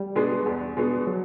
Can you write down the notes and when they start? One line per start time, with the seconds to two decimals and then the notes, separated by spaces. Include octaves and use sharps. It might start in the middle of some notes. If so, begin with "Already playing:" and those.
Already playing: G3
0.16 B2 G#3 B3 D4
0.46 E2
0.77 B2 G#3 B3 D4
1.07 F#3